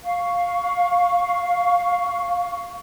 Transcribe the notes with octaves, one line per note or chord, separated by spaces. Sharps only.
F5 C#6